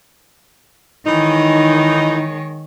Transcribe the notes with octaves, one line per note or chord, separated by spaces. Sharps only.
D#3 E3 G#3 D#4 C#5